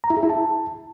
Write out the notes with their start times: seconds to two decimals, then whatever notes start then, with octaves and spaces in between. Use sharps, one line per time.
0.04 A#5
0.10 E4
0.17 G#4
0.23 E4
0.30 A5